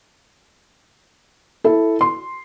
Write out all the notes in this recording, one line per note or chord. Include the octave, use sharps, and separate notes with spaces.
E4 A4
C6